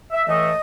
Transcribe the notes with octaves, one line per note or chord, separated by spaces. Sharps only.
E5
A2 E3 A3 D#5